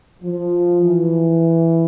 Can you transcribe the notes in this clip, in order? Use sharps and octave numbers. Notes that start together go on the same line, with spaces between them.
F3
E3